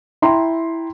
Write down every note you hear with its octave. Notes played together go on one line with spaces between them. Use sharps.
E4 G5 A#5 C6